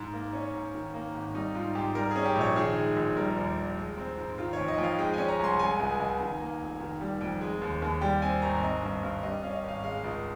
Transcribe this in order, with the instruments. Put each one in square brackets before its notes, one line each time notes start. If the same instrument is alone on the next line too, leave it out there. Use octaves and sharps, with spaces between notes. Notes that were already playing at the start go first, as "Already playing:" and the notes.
Already playing: [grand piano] G#2
A#3
C#4
G#2
D#3
A#3
G#1
G3 D#4
G#2 F4
G#2 G4
G3 A#4
C#4 G#4
G4
A#1
C#5
D#3 G#4
G#3
A#1
G3 A#4
D#2
D#2
G#3
C4
G#2
D#3 F4
F2 C#5
D#5
F2
F5
G#3 G5
C#4 G#5
A#5
C2 C6
G#3 G#5
C#2
C#2
D#3
A#3
F1
D#3
G3
F2
G#3
D#2
D#2
G3 G5
C4 G#5
G#1 A#5
C4 D#5
G2
G2
G3 D#5
C#4 F5
D#5
G#1 F5
G#3 F5
C#2